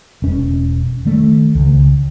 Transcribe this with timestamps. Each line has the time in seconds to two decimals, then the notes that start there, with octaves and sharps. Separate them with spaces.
0.22 E1 C#4
1.06 D#3 A3
1.55 C#2